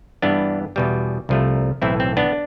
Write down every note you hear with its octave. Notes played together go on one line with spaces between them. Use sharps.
G2 E3 B3 D4
E2 B2 G3
C2 C3 F3 A3
B1 A2 E3 C4 E4
C4
B3 D4